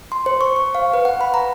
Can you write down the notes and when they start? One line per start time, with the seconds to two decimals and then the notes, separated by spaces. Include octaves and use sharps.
0.12 C6
0.26 C5
0.41 C#6
0.56 C#6
0.75 F5
0.94 B4
1.05 F#5
1.21 B5
1.34 A#5